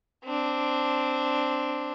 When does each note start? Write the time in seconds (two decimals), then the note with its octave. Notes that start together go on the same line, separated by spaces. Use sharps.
0.25 C4 D4